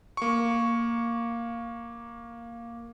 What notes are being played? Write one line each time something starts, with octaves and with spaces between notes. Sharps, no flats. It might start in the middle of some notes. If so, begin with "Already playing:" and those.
A#3 C#6